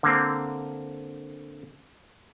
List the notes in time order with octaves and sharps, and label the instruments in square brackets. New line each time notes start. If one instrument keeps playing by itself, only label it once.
[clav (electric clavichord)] D3 A#3 C4